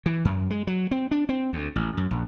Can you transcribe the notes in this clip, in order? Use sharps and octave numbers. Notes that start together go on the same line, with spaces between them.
E3
F#2
G#3
F#3
C4
D4
C4
D2
A1
F#2
A#1